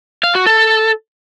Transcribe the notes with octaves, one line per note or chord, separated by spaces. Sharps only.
F5
F#4
A4